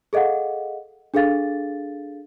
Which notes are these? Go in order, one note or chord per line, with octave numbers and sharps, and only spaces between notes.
G#4 A4 D#5 F5 F#5
D4 G#4 A4 F5 A6